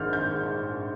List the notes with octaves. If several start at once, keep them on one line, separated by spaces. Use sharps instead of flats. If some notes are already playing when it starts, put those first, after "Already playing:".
Already playing: A#1 G#2 D#3 F6 G6
G6